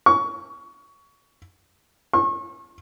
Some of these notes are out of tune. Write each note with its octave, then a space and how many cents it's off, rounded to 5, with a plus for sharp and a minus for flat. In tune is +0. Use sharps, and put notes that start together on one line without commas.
C#6 +20
C#6 -35